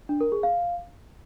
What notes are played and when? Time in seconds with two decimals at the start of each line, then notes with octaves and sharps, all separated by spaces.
0.09 D4
0.21 A#4
0.32 G#4
0.43 F5